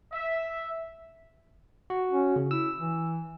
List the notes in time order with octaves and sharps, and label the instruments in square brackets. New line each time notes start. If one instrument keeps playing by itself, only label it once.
[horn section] E5
[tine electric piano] F#4
[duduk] C#4
[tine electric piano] C#3
[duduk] E4 [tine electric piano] E6
[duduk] E3